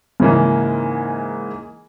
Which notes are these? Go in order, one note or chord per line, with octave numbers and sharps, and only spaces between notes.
G#2 C#3 E3 A#3